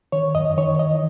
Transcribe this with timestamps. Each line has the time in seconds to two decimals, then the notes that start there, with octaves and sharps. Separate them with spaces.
0.12 D#3 C#5
0.35 F#2 D#5
0.57 D#3 C#5
0.79 E3 D#5